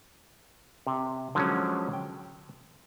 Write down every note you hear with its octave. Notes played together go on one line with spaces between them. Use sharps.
C3
D3 F3 F#3 G#3 C#4
G5